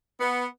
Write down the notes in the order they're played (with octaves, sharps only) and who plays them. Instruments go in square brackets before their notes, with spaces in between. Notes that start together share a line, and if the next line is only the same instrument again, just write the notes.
[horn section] B3